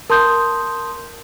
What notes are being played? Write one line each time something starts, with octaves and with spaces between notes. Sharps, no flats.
A#4 A5 C6 D#6 G6